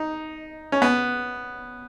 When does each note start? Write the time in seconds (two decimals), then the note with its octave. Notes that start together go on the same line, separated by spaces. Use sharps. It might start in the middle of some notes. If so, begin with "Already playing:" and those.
Already playing: D#4
0.72 C#4
0.82 B3